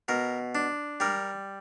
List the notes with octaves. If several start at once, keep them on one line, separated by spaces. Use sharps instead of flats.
B2 A#4
D4
G3 A#4